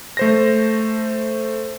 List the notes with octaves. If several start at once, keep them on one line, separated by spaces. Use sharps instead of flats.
A3 C5 A#6